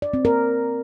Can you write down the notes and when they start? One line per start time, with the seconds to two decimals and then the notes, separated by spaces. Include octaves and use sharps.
0.02 D5
0.14 C4
0.25 A#4